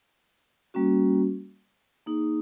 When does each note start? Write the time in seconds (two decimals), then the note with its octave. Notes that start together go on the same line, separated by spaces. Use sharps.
0.74 G3 A#3 C#4 F#4
2.06 A#3 D#4 G#4